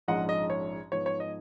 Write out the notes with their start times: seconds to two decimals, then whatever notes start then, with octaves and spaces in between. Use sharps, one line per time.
0.08 A#1 G#2 F3 G#3 C#4 D#5 F#5
0.29 D#5
0.50 C#5
0.92 G#2 F3 B3 C#5
1.06 C#5
1.20 D#5